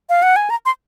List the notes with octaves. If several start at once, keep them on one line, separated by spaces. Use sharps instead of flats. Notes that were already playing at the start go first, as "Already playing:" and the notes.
F5
F#5
G#5
A#5
C6